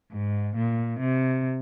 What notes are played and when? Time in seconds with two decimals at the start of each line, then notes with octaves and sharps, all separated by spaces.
0.12 G#2
0.56 A#2
1.00 C3